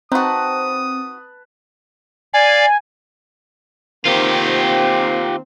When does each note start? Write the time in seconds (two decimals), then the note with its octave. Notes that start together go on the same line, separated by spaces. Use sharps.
0.12 C4 D#4 F#4 B4 A5 D#6
2.34 D5 F5 G#5
4.05 D#3 A#3 C4 F4 G4